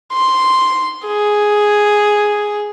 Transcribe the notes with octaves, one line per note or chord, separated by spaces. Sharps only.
C6
G#4